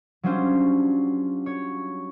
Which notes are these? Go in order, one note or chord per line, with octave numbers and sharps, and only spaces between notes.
F#3 G3 C#4 D4 F4 C5
C#5